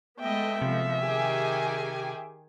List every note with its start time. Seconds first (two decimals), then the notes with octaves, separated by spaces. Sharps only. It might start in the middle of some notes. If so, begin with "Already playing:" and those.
0.20 G#3 A3 B3 D#5 E5 G5
0.62 C3 F3
1.02 D#3 G4 G#4 G#5